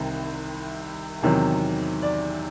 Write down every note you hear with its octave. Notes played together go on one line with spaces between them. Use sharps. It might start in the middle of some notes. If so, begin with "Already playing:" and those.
Already playing: C2 C3 D#3
E2 C3 D#3 F#3
D5